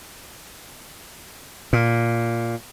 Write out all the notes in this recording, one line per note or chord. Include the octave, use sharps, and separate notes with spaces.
A#2